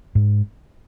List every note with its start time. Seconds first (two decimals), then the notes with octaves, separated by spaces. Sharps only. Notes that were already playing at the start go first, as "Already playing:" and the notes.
0.15 G#2